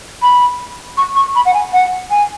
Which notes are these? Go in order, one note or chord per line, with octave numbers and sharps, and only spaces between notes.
B5
C#6
C#6
B5
F#5
G#5
F#5
G#5